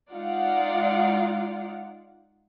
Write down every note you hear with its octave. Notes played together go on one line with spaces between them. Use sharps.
G#3 D#4 F4 D5 F5 F#5